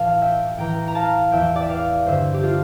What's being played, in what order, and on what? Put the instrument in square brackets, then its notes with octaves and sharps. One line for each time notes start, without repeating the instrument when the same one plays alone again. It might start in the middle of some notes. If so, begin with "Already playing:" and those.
Already playing: [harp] A2 E3 F5 A5
E5 G5
A2 E3 G5 A#5
A#5
F5 A5
E2 E3 E5 G5
D5
E5
D5 F5
G2 D3 C5 E5
G4
F4 A4